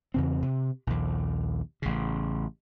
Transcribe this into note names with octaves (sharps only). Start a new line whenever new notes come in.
E2 C#3 C4
C3
A#1 D#2
A1 C#3